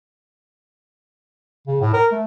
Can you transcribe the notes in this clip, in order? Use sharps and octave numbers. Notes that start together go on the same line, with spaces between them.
C#3
A2
A#4
A3